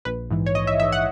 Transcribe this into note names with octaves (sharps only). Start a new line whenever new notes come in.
A#1 B4
G#2 E3
C#5
A#1 D#5
E5
G#2 E3 E5
F#5